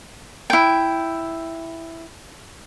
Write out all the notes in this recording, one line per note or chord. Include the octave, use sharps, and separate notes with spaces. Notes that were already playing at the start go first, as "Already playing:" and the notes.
E4 G5